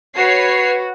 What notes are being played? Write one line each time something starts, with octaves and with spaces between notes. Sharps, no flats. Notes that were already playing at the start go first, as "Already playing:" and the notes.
F#4 B4 C#5 C7